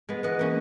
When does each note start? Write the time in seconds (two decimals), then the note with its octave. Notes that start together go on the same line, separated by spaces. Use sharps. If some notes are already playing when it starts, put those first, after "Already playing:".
0.09 G#3 B3
0.23 E3 D#5 F#5
0.39 A#3 C#4